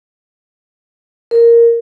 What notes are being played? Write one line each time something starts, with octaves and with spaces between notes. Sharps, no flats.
A#4